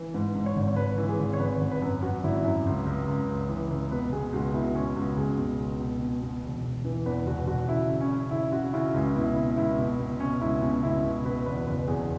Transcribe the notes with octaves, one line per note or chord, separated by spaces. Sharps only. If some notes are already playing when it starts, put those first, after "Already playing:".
Already playing: E3
G#2 B4
G#2
C#5
G#1
G#1 B4
E3
G#4
G#1
C#5
G#1 B4
G#1
B4
F#2
F#2 F#4
G#1 E4
F#2 E4
C#2
C#2
C#2
C#2
E3
C#2
B2 B4
B2 G#4
C#2 F#4
B2 E4
C#2 C#4
C#2 F#4
C#2 G#4
B2
C#2
B2
B2
B2
E1
E1
E3
E2 B4
E1 F#4
E1 F#4
C#3 E4
C#3
C#4
C#3
C#3 E4
C#3 F#4
C#3 E4
C#2 C#4
B2 E4
B2 E4
C#2 E4
B2
B2
B2 C#4
C#2 E4
B2 C#4
C#2 E4
B2
B2 B4
E2 B4
F#1 B4
E2 G#4